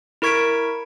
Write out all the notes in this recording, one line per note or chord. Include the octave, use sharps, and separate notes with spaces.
E4 A#4 C#6 G#6 B6 D7